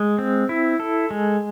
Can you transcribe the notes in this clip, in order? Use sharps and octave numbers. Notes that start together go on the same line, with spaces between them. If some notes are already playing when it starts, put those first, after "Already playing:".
Already playing: G#3
C4
E4
A4
G#3